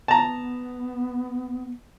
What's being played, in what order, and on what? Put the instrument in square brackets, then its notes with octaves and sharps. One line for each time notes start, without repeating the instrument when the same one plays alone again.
[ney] B3 [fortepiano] A5 A#5